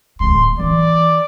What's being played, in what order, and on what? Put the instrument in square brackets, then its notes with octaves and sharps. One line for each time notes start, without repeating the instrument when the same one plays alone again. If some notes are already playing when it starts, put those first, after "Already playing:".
[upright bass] D1 G#3 [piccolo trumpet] C6
[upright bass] E3 [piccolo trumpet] D5